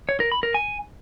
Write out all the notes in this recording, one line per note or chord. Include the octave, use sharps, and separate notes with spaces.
C#5
A#4
B5
A#4
G#5